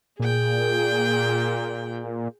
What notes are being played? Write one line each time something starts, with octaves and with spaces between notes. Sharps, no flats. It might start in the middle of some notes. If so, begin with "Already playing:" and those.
A#2 G#4 G5